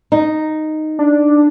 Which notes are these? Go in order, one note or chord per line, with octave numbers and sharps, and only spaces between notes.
D#4
D4